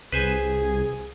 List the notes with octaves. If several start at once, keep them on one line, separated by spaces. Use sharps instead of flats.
C2 G#4 B4 C5 G#5